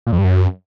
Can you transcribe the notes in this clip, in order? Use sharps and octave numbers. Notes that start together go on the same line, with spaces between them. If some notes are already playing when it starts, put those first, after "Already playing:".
A#2
F2
G2
F#2